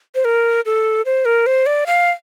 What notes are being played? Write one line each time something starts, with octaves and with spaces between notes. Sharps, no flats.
C5
A#4
A4
C5
A#4
C5
D5
F5